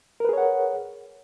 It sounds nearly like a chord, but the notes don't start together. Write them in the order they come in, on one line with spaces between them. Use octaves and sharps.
A#4 B4 G#4 C#5 F#5